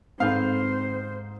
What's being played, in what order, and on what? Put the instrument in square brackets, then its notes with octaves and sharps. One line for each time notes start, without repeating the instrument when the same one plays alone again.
[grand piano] G#2 G6 [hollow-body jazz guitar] C4 A4 B4 [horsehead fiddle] C5 [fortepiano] F5